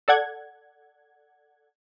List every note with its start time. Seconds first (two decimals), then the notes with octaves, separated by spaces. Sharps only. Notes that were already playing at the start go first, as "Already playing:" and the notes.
0.08 A4 D5 F#5 G#6